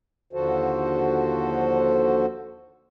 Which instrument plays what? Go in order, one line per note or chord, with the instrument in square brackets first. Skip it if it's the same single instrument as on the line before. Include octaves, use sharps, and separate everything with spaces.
[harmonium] D#2 D3 F3 F#4 A4 C5